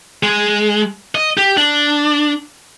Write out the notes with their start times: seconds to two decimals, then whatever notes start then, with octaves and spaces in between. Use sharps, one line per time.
0.23 G#3
1.15 D#5
1.38 G4
1.57 D4